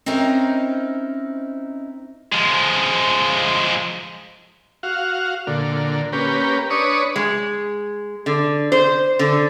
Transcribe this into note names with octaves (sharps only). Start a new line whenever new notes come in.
C4 C#4 D#4 E4 A#4 C5
F3 G#3
F#4 F5
A#2 D3
A#3 C#4 G4 B4
D4 B4 C#5 C#6 D#6
G#3
D3
C5
D3